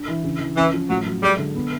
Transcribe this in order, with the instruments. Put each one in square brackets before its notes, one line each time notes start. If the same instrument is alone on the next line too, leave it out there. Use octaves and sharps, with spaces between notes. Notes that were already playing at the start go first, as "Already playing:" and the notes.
Already playing: [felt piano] D4
E3
C#3
E3
[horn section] E3 [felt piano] C#4
[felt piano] F3
[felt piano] A2 [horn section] F#3
[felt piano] F#3
[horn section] G3 [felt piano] G#3
[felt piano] D3
B3